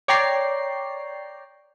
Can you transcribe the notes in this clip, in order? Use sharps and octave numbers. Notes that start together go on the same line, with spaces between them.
C#5 D5 G5 A#5 C7